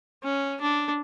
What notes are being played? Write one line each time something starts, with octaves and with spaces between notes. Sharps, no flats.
C#4
D4